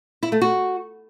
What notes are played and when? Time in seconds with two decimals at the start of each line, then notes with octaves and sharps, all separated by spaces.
0.23 E4
0.32 A3
0.41 F#4